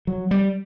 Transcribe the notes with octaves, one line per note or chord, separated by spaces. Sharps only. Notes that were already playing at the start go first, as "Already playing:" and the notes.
F#3
G3